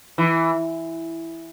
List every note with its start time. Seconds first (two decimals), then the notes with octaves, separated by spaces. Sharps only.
0.18 E3